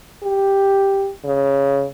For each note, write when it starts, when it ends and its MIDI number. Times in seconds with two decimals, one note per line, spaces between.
0.23 1.10 67
1.24 1.86 49